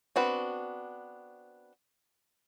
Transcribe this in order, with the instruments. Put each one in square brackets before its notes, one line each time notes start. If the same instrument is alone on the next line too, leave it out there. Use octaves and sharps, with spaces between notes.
[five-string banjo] B3 C4 D4 F#4 B4